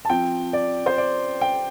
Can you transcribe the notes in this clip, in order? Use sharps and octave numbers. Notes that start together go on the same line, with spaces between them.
A5
F3 C4 G5
D5
C5
D5
G5